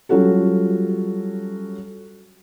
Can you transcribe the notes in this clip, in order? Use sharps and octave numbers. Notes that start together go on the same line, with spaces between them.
F#3 G3 C#4 F4 F#4 A4